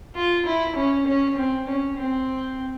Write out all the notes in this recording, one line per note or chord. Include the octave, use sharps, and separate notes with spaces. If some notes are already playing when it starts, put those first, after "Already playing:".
F4
E4
C#4
C#4
C4
C#4
C4